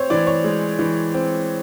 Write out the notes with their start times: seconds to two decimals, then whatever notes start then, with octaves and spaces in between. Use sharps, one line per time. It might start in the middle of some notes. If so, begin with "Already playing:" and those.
Already playing: C4 C5 C#5
0.10 E3 D5
0.27 C#5
0.44 G#3
0.79 E3
1.14 C4